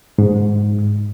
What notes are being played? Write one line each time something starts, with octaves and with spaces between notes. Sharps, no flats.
G#2